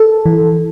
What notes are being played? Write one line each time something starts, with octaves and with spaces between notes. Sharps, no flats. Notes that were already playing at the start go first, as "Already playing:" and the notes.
Already playing: A4
E3